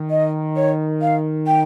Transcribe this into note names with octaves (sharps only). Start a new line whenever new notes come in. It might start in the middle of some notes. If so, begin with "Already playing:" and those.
Already playing: D#3
D#5
C#5
F5
G5